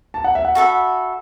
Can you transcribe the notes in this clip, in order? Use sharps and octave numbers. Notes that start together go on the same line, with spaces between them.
A5
F#5
E5
F#5
F#4 A4 E5 B5